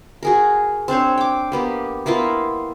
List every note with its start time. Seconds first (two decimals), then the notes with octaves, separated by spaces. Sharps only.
0.23 F#4 G#4 A#4
0.88 C4 D4 C5 C#5
1.18 G5 D6
1.52 A#3 B3 G4
2.06 A#3 B3 E4 F4